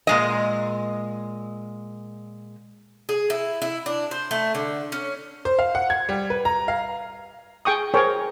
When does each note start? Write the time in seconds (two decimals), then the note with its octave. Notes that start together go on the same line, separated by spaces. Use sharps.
0.07 A#2 G#3 D#5
3.09 G#4
3.30 E4
3.62 E4
3.86 D4
4.11 C5
4.31 A3
4.55 D3
4.92 C#4
5.45 C5
5.59 F5
5.75 F#5
5.90 G#6
6.09 G3
6.30 B4
6.45 A#5
6.68 F5
7.65 G#4 G5 C#6 D#6
7.94 G#4 A#4 C5 C#5 G5